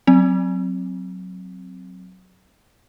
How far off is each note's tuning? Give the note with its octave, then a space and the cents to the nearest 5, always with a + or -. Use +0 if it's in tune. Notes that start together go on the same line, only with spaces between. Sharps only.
F#3 +0 C4 +0